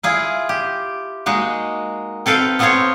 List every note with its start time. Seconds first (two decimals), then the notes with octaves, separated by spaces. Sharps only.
0.03 E4 F4 G#4
0.49 G4
1.26 G#3 A#3 D#4 F#4
2.26 C4 A4 B4 F5 G5
2.59 B3 C4 F4 A4 C5 C#5